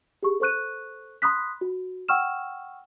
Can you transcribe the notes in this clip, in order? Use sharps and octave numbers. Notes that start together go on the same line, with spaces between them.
G4 G#4 C#6
A4 C5 C#6 F#6 D#7
B5 C6 D#6 F#6 B6
F#4
F#5 G5 C#6 E6 F6 E7